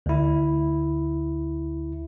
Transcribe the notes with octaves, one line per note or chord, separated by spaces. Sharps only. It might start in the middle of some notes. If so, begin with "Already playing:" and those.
D2 E4